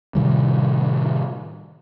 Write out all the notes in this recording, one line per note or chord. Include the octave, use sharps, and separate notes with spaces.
A2 C3 D#3 G3